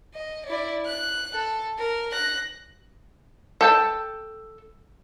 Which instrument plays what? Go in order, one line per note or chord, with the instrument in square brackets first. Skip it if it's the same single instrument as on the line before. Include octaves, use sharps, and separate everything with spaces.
[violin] D#5
E4 D5
F#6
A4
A#4
F#6 A#6
[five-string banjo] A4 G5 A5